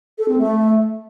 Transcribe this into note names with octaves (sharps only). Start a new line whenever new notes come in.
A4
C4
A3